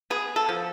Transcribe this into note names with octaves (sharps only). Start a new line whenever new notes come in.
B3 G#4
A4
F3